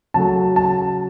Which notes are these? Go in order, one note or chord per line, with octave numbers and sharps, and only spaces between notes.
C#3 F#3 A3 A5
A5